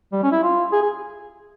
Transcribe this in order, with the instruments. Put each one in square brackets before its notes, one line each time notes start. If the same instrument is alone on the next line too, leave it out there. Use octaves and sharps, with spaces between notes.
[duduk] G3
C#4
E4
F4
G#4
G#4